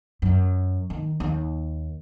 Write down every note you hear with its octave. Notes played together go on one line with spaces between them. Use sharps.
F#2
D#3
D#2